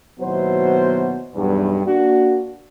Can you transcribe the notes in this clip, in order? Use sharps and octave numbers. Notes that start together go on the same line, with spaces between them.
D#2 B2 F#3 B3 E4 C5
B1 E2 G2
A#3 D4 F#4